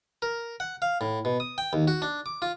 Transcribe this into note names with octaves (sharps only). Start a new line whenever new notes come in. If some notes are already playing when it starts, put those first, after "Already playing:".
A#4
F#5
F5
A2
B2
D#6
G5
D#2
F#4
D4
D6
F4